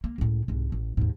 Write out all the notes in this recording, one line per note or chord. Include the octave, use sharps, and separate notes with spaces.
A#3
C#2 A2
C2 G#2
A1
D#2 G#2